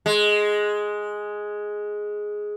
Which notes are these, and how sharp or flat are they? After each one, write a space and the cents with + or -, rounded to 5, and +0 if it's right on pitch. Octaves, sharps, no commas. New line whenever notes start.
G#3 +5